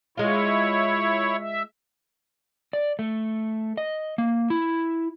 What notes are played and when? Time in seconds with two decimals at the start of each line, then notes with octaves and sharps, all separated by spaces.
0.17 G#3 E4 F4 C#5
1.40 E5
2.73 D5
2.99 A3
3.77 D#5
4.18 A#3
4.50 E4